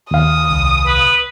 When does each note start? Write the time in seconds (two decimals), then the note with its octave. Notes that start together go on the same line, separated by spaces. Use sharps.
0.11 D#2 F5 D#6
0.51 C2
0.87 B4